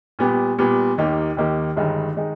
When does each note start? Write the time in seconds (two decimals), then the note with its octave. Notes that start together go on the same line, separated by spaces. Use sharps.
0.19 A#2 G3 B3 G4
0.58 A#2 G3 B3 G4
0.98 D#2 D#3 A#3 D#4 G4
1.37 D#2 D#3 A#3 D#4 G4
1.76 G1 G2 D#3 G#3 D#4
2.17 D#3 G#3 D#4